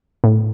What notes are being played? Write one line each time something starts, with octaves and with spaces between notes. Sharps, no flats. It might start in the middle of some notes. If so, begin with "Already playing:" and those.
A2